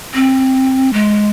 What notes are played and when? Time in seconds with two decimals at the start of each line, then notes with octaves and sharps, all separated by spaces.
0.14 C4
0.93 G#3